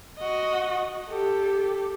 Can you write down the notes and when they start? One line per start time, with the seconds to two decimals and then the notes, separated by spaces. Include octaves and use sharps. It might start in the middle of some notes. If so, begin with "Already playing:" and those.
0.18 F#4 D#5
1.08 G4 A4